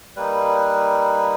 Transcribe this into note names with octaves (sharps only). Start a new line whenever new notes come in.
G3 A#3 D#4 B4